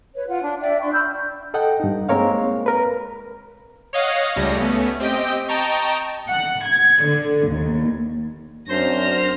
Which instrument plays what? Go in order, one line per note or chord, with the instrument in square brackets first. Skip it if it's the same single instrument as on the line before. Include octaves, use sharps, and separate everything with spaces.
[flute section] B4 C#5
F4 F#5
D4
D5 E5 G5
D4 D5 C6 C#6
B5 E6 F6 G6
[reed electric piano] A4 D#5 F#5 G5
G2 D#4
G#3 A#3 C4 A#4 C#5 F5
A#4 B4
[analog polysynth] C#5 D#5 F5 F#5 D#6
C#2 G3 A3 C#4 A#6
A3 B3 C#4
C4 G4 D#5 G5
D#5 G5 A5 A#5 C#6
[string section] F#5
G#6
D3
D#2
[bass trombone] F#2 [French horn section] C4 D4 [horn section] C5 [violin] F6 A#6